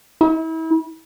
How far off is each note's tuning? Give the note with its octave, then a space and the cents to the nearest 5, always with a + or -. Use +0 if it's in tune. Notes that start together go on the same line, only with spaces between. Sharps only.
E4 -35